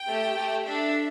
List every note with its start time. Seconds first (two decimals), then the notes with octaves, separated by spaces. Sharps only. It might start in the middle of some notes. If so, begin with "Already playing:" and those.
Already playing: G5
0.09 A3 G4
0.37 A3 G4
0.65 D4 A4 E5